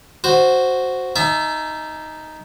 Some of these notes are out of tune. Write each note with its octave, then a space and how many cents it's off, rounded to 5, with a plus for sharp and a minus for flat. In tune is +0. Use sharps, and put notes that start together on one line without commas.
F#4 +0 C5 +0
D#4 +0 E5 +20 A5 -40